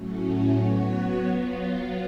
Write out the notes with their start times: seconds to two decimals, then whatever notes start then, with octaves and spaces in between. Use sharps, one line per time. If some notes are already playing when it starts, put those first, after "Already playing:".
Already playing: A2 F#3 A3 C#4
0.58 F#3 B3 F#4 C#5
1.24 F#3 B3 F4